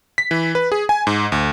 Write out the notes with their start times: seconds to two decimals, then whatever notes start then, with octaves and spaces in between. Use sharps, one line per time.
0.18 B6
0.31 E3
0.55 B4
0.72 G#4
0.89 G#5
1.07 G#2
1.32 D2